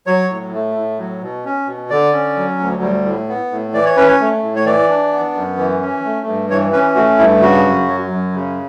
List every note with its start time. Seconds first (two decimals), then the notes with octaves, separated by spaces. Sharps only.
0.07 F#3 C#5
0.30 A2
0.53 A3
0.75 A2
0.99 F#3
1.21 B2
1.45 C#4
1.67 B2
1.90 D3 D5
2.13 C#4
2.36 F#3
2.60 D2
2.82 G3
3.05 A2
3.29 B3
3.51 A2
3.74 E3 D5
3.85 C#5
3.97 C#4 B4
4.08 C#5
4.20 A3
4.43 A2
4.56 C#5
4.65 E3 D5
4.89 D4
5.12 B3
5.34 F#2
5.57 E3
5.80 C#4
6.04 A3
6.26 G2
6.50 E3 C#5
6.72 C#4 B4
6.95 A3 F#4
7.18 G2 E4
7.41 C#3 F#4
7.64 F#2
7.88 F#3
8.10 F#2
8.33 C#3